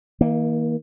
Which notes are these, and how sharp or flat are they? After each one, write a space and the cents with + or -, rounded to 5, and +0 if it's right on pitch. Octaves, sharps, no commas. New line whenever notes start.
D#3 +40 A#3 +0